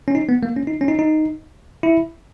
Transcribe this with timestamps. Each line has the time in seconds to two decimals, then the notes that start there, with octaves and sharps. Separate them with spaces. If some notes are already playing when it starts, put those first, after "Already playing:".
0.08 C#4
0.15 D#4
0.29 B3
0.43 A#3
0.57 C#4
0.67 D#4
0.81 C#4
0.88 D#4
0.99 D#4
1.83 E4